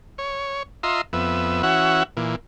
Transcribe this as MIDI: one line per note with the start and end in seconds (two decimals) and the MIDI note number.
0.18 0.63 73
0.83 1.01 65
0.83 1.01 75
0.83 1.01 76
0.83 1.01 82
0.83 1.01 84
1.13 1.62 41
1.13 1.62 59
1.13 1.62 76
1.63 2.03 52
1.63 2.03 61
1.63 2.03 66
1.63 2.03 76
1.63 2.03 78
2.17 2.36 46
2.17 2.36 52